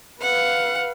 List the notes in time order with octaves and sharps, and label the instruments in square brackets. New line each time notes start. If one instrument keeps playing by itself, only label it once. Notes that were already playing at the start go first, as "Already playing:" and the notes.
[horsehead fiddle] B4 F5 [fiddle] F#5